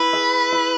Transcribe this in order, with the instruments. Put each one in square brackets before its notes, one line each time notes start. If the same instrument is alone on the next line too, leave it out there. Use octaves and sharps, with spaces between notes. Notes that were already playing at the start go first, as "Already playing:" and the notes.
Already playing: [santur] E4 [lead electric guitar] B4
[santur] G#4 E5
E4